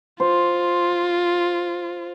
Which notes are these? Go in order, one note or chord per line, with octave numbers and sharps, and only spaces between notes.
F4 C5